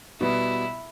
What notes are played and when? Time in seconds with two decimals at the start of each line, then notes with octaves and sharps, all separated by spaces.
0.21 B2 G3 B3 E4